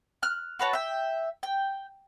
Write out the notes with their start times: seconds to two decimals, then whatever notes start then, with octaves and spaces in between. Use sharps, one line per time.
0.22 F6 F#6
0.59 F#4 B4 C#5 A5
0.73 E5 G5
1.43 G5